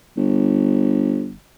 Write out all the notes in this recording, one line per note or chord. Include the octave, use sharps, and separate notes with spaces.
G1